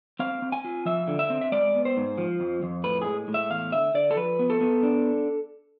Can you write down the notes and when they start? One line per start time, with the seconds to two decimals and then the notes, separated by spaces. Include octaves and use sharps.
0.19 C4 F5
0.42 C4
0.52 G#5
0.64 F4
0.85 F3 E5
1.08 D3
1.19 E5
1.30 C4
1.41 E5
1.52 G#3 D5
1.74 B3
1.85 C5
1.97 G#2
2.18 F3
2.40 F2
2.63 F2
2.84 A2 B4
3.02 G#4
3.07 G#3
3.28 A2
3.34 E5
3.50 E2 F5
3.72 D3 E5
3.94 D3 D5
4.11 A4
4.16 F3 B4
4.39 B3
4.50 A4
4.61 B3
4.83 D4